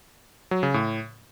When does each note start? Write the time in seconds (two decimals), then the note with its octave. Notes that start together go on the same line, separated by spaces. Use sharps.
0.51 F#3
0.63 C#3
0.74 A2